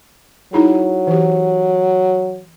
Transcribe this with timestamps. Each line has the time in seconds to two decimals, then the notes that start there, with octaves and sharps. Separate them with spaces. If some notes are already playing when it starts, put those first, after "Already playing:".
0.53 F#3 D#4 E4 G#4
1.07 E3 G4